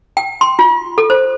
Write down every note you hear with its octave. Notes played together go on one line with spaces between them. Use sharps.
G5
C6
F4
A4
C5